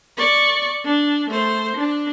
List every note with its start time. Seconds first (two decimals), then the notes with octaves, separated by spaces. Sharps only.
0.17 D5 C#6
0.85 D4
1.30 A3 C5
1.76 D4